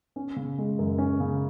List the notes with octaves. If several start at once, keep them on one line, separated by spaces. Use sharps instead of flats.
C#4
C#3
G#3
F#2
C#4
C#3